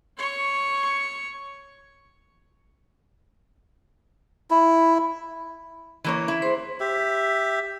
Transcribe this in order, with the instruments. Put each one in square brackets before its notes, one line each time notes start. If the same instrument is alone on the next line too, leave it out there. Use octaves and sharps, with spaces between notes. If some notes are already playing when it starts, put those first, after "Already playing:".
[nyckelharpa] C#5 C#6
[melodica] E4
[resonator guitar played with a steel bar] E3 A#3 C#5
E4
[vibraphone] G#4 C5 C6
[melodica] G4 E5